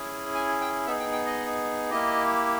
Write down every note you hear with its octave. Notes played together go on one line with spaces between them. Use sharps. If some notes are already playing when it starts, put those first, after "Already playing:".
Already playing: C#4 E4 G#4
G#5
G5
B3 D#4 G#4 E5
G5
G5
D#5
A#3 E4 G4 D#5